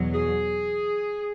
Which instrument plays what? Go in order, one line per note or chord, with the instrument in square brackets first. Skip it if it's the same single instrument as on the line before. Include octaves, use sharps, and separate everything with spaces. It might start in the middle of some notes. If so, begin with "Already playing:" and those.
Already playing: [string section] E2 B2 F#3
[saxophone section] G#4